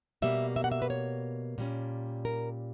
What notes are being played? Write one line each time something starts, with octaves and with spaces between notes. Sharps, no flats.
B2 G3 A#3 E5
E5
F#5
E5
B4
C#5
A#2 G3 C#4
A#4